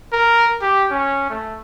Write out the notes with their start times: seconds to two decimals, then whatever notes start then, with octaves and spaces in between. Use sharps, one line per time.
0.13 A#4
0.62 G4
0.91 C#4
1.30 A3